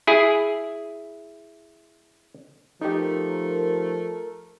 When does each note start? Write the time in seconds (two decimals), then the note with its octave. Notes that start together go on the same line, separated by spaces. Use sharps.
0.07 E4 G#4
2.82 F3 A3 D#4 G4 A#4